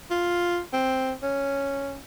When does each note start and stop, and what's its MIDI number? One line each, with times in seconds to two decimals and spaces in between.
0.10 0.60 65
0.73 1.13 60
1.23 1.97 61